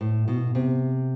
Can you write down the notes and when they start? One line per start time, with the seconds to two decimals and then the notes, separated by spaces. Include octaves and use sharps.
0.01 A2
0.28 B2
0.55 C3